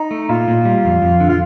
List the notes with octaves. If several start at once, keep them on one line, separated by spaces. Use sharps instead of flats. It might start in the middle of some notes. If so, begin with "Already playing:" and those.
Already playing: D#4
A3
A#2 F4
A#2
G3
F2
F2
D3
F4